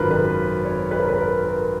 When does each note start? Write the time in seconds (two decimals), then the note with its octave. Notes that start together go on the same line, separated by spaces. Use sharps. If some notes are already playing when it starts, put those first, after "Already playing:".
Already playing: G#1 F#2 F4 A#4 B4
0.11 B4
0.65 C#5
0.91 B4
1.00 A#4
1.09 B4
1.18 A#4
1.45 A#4